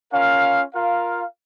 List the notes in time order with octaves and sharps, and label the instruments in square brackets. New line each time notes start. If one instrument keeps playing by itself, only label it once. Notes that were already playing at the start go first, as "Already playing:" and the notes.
[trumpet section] C#4 F4 A#4 F5
F4 A#4 F5